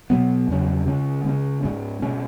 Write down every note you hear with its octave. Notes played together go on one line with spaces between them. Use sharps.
B2 F#3 B3
E2 C#3 F#3 C#4
C#3 G#3 C#4
C#3 G#3 C#4
G#2 G#3 C#4
B2 G#3 C#4